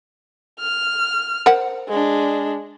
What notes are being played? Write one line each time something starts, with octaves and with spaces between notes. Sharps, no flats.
F6
A#4 C5 F#5
G#3 D4